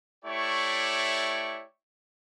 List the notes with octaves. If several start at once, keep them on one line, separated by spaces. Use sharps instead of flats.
A3 E4 G4 C#5 D5 C#6